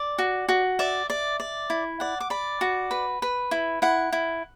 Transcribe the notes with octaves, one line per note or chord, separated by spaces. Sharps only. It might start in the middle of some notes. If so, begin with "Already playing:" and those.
Already playing: D5
F#4
F#4
D5 E5
D5
D5
E4
D5 F#5
D6
D5 B5
F#4
B4
B4
E4
E4 F#5
E4